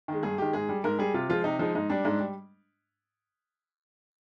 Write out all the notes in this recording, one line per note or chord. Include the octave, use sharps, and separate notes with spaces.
D#3 G#3
G2 G#4
D#3 G#3 G4
G#2 G#4
G3
G#2 A#4
G3 G#4
C3 F4
F3 G#3 F4
C3 D#4
F3 G#3 D#4
G#2 D#4
G3 D4
G#2
G3